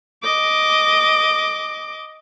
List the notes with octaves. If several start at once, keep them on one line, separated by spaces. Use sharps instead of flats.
D#5 D6